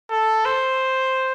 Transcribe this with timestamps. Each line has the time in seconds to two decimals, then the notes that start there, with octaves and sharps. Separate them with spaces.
0.10 A4
0.45 C5